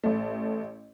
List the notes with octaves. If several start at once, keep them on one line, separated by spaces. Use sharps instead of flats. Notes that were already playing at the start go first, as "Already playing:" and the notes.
A1 A3